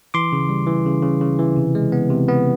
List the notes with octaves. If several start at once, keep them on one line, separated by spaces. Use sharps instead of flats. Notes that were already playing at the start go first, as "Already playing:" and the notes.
E3 C6 D6
C#3
G3
E3
C#3
C#3
C#3
E3
C3
G#3
B3
C3
B3